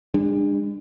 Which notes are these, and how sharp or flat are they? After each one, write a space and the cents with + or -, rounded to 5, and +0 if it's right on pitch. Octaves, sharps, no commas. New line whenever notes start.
G#3 -45 D4 +20